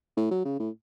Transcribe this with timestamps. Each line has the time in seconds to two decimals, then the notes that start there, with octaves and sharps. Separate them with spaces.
0.17 A2
0.31 F#3
0.45 C#3
0.60 A2